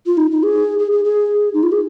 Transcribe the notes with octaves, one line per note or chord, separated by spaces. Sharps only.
F4
D#4
D#4
G#4
G#4
G#4
G#4
D#4
F4
G#4